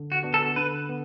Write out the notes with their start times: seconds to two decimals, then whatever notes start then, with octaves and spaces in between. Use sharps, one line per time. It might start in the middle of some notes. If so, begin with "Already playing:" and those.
Already playing: D3
0.12 F#4
0.23 B3 D4 F#4
0.34 A4
0.56 D3 B4
0.89 B3